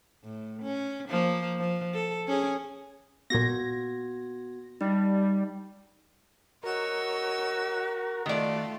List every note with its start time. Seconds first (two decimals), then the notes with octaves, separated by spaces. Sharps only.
0.23 A2
0.62 C#4
1.09 F3 A#3
1.59 F3
1.94 A4
2.28 C#4 G#4
3.30 A#2 B3 F#4 G#6 A#6
4.81 G3 D#4
6.63 F#4 A#4 C#5 D#5 E6
8.26 D#3 A3 F4 D5